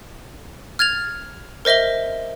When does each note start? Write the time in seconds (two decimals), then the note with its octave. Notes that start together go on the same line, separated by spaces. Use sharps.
0.79 F6 G#6 A6 F7
1.65 A#4 C5 D#5 E5 G7